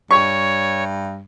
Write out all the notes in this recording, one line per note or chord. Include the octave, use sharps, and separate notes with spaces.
G2 C#5 C#6